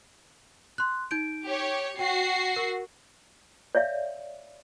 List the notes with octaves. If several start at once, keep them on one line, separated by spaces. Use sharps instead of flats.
C6 F#6
D#4 G6 D7
G4 C#5
F#4 G5 C7
A#4
C#5 D5 E5 F5